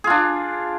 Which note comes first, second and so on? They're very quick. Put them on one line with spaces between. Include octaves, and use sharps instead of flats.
G#4 F4 D4